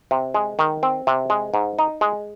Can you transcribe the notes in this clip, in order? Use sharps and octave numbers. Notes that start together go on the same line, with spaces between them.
C3
G#3
D#3
C4
C3
G#3
G#2
D#4
G#3